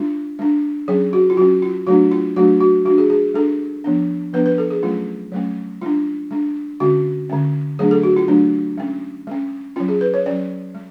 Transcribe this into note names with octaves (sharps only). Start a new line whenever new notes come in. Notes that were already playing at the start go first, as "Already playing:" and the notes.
Already playing: G#3 D4 F4
G#3 D4
F#3 C#4 G#4
F#4
F4
F#3 C#4 F#4
F4
F#3 A3 D4 F#4
F4
F#3 A3 D4 F#4
F#4
G#3 D4 F#4
G#4
G#4
G#3 D4 A4
F3 B3 D4
F3 B3 D4 B4
B4
A4
G#4
F#3 A3 C#4 F4
F#3 A3 C#4
G#3 D4 F4
G#3 D4
D3 G#3 C#4 F#4
D3 G#3 C#4
F#3 A3 D4 G#4
A4
F#4
F4
F#3 A3 D4
G#3 C#4
G#3 C#4
F#3 C#4 F4
G#4
B4
C#5
F#3 C#4 D5
G#3